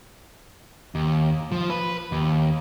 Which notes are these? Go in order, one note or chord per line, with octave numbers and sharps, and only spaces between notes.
D#2
F3
B4
D#2